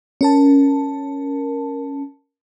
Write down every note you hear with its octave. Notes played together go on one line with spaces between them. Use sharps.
C#4 A#4 A5